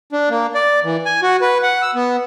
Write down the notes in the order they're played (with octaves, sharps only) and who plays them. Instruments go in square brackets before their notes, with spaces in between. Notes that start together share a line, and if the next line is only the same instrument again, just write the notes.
[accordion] D4
A#3
D5
E3
G#5
F#4
B4
F#5
E6
B3